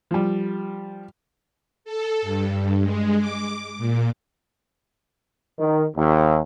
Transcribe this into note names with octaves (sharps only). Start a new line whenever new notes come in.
F3 G3
A4
G2
G#3
D6
A#2
D#3
D#2